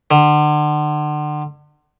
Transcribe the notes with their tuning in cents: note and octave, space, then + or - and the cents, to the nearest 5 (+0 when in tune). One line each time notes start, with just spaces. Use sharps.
D3 +35